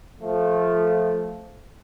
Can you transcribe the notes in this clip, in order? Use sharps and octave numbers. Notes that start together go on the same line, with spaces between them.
F3 A3